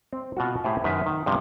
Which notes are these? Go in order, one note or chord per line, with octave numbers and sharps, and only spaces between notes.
C4
B2 F4 F#4
A2 G4 C5 E5 G#5
F#2 D#3 B4 E5
D#3
G2 C3 F3